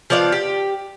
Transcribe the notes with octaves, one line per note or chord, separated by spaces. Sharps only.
F3 B3 D5 F5
G4